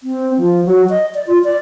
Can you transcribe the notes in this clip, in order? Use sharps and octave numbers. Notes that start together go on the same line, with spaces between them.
C4
F3
F#3
D#5
D5
F4
D5